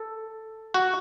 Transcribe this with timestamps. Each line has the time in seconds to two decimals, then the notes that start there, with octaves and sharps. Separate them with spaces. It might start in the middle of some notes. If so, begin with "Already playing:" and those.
Already playing: A4
0.74 F#4